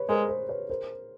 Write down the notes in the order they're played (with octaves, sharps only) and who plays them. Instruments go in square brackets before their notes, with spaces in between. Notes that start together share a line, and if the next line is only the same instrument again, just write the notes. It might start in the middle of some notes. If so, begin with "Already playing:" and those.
Already playing: [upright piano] B4 C#5
[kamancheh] G#3 [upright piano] A#4 C5
[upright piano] A#4 C5
B4 C#5
A#4 C5